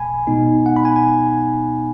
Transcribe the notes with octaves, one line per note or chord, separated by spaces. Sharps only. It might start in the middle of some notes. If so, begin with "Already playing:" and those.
Already playing: B1 B2 G#3 G#5 B5
B2 G#3 B3 D#4
F#5
B5
G#5
G#5